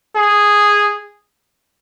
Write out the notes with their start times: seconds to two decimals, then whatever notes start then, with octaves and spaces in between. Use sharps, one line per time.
0.16 G#4